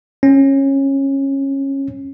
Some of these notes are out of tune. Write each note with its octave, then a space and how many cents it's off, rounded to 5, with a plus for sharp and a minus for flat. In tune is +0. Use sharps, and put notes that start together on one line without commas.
C#4 -20